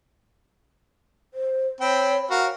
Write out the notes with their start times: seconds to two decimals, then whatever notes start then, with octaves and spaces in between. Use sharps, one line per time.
1.34 C5
1.81 C4 C#5 G5 B5
2.30 F#4 A#4 F5